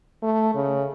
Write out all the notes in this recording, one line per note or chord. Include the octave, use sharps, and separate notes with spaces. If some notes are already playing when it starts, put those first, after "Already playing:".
A3
C#3